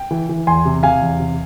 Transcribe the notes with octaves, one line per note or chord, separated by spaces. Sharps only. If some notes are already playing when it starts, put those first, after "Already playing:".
Already playing: G5
E3
E3
E2 G#5 C6
C3
C3 F5 G#5
E2
C3